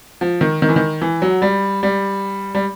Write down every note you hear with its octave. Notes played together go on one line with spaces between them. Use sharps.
F3
D#3
D#3
E3
D#3
E3
F#3
G3
G3
G3